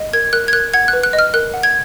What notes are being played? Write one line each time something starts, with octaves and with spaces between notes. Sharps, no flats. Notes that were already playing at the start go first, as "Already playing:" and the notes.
Already playing: D#5
A#4 G#6
A#4 F#6
G#6
A#4 F#6
F#5 G#6
F#6
B4
F#6
D#5
F6
A#4 F#6
F#5
G#6